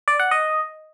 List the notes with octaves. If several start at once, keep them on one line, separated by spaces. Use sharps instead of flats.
D5
F#5
D#5